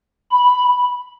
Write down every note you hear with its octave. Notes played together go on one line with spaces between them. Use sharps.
B5